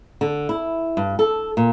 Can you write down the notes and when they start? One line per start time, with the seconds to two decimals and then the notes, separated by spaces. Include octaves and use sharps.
0.21 D3
0.49 E4
0.97 G2
1.19 A4
1.57 A#2